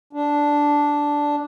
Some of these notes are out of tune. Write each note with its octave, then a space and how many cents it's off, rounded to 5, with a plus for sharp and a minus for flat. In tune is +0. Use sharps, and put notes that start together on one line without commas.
D4 -5